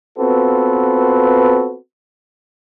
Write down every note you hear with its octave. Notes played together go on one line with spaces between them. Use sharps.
B3 C4 F4 F#4 A4 B4